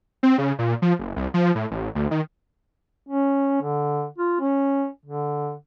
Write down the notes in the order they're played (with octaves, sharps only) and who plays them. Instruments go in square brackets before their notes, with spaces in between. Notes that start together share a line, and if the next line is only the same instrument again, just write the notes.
[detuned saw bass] C4
C#3
A#2
F3
F#1
C2
F3
A2
A1
D2
D#3
[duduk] C#4
D3
F4
C#4
D3